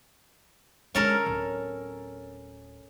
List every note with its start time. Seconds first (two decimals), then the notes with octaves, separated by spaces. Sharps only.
0.95 D3 G#3 C#4 A4 A#4
1.26 D1